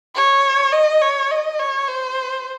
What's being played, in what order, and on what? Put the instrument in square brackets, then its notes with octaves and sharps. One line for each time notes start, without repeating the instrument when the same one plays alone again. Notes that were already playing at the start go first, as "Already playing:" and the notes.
[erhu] C#5
D#5
C#5
D#5
C#5
C5